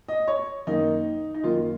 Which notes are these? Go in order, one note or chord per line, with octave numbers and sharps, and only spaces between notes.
D#5
C#5
F#2 D#3 A#3 D#4
D#4
F#2 D#3 A#3 F4